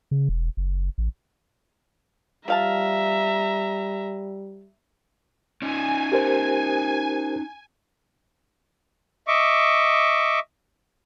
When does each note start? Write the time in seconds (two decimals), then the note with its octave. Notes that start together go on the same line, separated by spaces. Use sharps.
0.11 C#3
0.29 E1
0.57 F#1
0.98 A1
2.48 F3 G3 E5 F5 A5 A#5
5.62 C#4 D#4 G#5
6.12 G4 A#4 C5
9.27 D#5 E5 C#6 D6